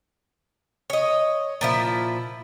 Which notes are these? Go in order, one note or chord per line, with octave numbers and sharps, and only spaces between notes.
C#5 D#5
A#2 F3 E4